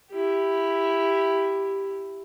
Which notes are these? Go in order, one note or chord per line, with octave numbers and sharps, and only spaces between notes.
E4 G4